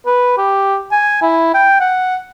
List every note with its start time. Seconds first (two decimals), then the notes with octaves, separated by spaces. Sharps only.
0.06 B4
0.38 G4
0.92 G#5
1.22 E4
1.54 G5
1.80 F#5